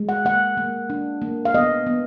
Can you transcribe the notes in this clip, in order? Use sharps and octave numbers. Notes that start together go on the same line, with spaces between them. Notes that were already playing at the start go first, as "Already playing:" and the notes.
Already playing: G#3
F#5
A#3 F#5
A#3
D4
A#3
F5
B3 D#5
B3